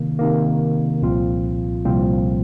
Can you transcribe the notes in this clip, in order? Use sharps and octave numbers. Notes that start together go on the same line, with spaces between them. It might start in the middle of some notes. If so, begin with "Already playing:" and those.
Already playing: C3 D#3 A#3
C3 D#3 A#3
C2 A#2 F3 C4 F4
C2 A#2 F3 C4 F4